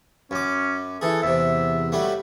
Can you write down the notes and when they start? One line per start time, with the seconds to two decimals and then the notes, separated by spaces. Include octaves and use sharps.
0.31 F#2 C#4 D6
1.01 E3 G#4 A4
1.22 E2 C3 E5
1.92 F#3 G3 A3